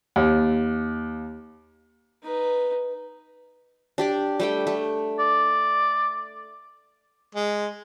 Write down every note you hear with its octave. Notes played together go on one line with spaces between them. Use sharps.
D#2
D#4 B4
D4 G4 D5
G3 A3 G5
A3
D5
G#3